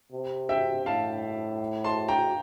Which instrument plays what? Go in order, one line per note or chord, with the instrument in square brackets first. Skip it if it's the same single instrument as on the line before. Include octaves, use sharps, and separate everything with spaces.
[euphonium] C3
[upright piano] E5 G5
[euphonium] A2 [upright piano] F5 A5
[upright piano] A5 C6
G5 A#5